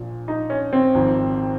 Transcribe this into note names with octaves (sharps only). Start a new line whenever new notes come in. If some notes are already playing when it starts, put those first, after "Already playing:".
Already playing: A#1 A#2 F3
D#4
C#4
C4
G#1 G#2 F3